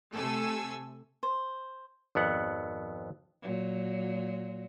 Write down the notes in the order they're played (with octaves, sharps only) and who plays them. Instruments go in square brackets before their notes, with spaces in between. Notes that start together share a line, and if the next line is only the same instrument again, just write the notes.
[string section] C3 A3 A4 G#5 E6
[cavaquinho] C5
[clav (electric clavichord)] G#1 F2 B3 F#5
[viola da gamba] A#2 F#3